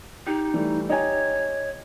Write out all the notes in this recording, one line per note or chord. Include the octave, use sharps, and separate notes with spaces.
D#4 G4
E3 G3 A3
D#4 G4 C#5 G#5